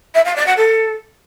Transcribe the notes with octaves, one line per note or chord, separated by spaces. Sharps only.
E5
F5
D5
F#5
A4